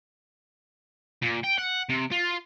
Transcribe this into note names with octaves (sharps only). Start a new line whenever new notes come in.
A#2
G5
F#5
C3
F4